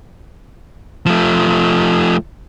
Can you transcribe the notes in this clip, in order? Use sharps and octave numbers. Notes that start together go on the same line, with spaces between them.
F3 A3